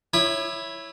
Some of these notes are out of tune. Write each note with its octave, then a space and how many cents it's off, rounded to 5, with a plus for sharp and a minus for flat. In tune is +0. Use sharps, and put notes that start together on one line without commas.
E4 +0 C#5 +0 D#6 -45